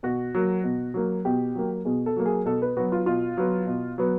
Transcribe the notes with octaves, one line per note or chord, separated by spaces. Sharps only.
B2 F#4
F#3 A#3
B2
F#3 A#3
B2 G4
F#3 A#3
B2 G#4
A4
F#3 A#3
G#4
B2 A4
B4
F#3 B3 F#4
F4
B2 F4
F#3 B3
B2
F#3 B3